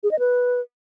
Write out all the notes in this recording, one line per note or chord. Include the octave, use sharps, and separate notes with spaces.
G#4
D#5
B4